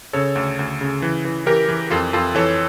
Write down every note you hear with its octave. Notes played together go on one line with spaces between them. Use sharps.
C#3 A4 C#5
D2
D2
C#3
E3
E3
E3 G4 A#4
E3
F2 F4 A4
F2 F4 A4
E3 A4 C#5